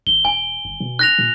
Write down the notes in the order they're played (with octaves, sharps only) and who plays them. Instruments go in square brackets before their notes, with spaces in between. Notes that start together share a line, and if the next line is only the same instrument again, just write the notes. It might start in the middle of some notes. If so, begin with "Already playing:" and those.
[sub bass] A1 [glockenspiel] G7
[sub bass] E1 [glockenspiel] G#5
[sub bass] G1
B2
[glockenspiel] F#6 A#6 F7
[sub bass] A#2